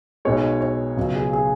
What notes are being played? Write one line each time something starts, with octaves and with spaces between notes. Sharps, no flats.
B1 B2 G#3 C#5
C#5
C#2 B2 F#3
G#4
G#4